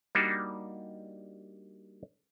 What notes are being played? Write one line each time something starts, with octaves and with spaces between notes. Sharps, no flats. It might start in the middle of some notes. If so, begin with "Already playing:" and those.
G3 A#3 D4 D#4 F#4 G4